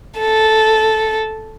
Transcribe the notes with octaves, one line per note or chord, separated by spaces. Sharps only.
A4